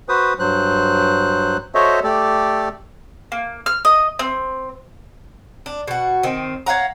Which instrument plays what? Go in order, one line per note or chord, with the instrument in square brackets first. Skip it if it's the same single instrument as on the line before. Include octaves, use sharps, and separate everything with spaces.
[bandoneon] F#4 B4 C5 D#6
G2 F#3 C5 F#6
F#4 A4 C5 C#5 D#5 E5
A3 G4 A4 D5
[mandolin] A#3
F6
D#5
C4
[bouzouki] D4
B2 F#4
D#3 C4
C#5 F5 F#5 A#5